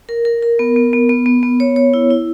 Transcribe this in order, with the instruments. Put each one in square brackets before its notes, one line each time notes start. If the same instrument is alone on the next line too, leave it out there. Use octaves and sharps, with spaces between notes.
[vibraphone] A#4
A#4
A#4
B3
B3
B3
B3
B3
B3
C#5
C#5
E4
E4